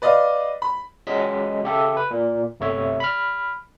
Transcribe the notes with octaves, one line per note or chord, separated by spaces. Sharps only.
B4 D5 D#5 F5
B5
F#3 G#3 C#4 D#5 B6
C#3 G4 A4 E5
B4
A#2
G1 C3 A3 C#5 E5
B5 F6